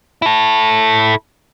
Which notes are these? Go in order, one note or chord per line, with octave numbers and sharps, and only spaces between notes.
E4 A4